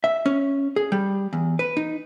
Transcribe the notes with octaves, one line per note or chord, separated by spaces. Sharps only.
E5
C#4
G#4
G3
E2
B4
D#4